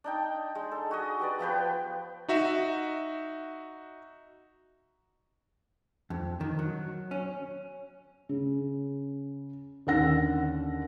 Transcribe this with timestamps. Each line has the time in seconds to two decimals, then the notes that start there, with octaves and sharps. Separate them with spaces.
0.04 D4 D#4 G5
0.55 G#3
0.72 A4
0.91 F#4 G#4 D#5
1.20 G4 B4 D5
1.39 F3 B3 B4 G5
2.28 D#4 F#4 E5
6.10 F2
6.41 D#3
6.59 F#3
7.11 C#4
8.29 C#3
9.87 D#2 D3 C#4 F#5 E6 A#6